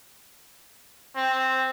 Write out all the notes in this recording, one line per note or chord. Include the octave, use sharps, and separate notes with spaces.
C4